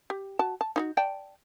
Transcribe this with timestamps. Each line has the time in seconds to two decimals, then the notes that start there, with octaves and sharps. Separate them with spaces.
0.10 G4
0.39 F#4 A5
0.61 A5
0.76 D#4 F4 F#4
0.97 D5 G5 A5